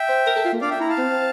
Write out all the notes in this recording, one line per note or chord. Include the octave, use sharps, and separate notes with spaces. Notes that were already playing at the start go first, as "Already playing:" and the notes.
Already playing: E5 G5
C5
A#4
A4
F4
A#3
D4 D5 F5
E5 G5
E4 A#5
F5 A5
C4